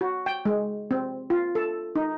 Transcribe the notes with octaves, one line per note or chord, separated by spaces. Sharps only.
F#4
G5
G#3
C4
F4
A4
D#4